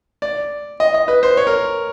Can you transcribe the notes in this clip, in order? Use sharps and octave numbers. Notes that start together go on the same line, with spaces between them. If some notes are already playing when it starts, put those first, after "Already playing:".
D5
D#5
D#5
B4
C5
C#5
A#4